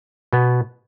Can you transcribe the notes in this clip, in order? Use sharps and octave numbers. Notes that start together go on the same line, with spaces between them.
B2 B3